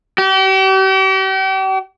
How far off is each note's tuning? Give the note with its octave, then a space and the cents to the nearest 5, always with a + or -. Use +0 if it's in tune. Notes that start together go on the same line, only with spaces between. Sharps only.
G4 -40